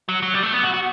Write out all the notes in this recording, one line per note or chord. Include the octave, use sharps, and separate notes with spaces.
F#3
F#3
G3
A3
B3
F#4
F#4